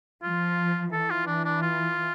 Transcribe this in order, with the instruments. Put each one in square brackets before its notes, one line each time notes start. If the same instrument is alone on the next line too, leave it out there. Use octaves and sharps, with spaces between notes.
[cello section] F3 [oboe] F4
[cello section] E3 [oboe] A4
[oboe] F4
D4
D4
F4